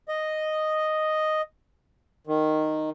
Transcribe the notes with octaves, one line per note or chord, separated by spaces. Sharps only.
D#5
D#3